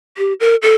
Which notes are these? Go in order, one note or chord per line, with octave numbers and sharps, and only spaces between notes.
G4
A#4
A4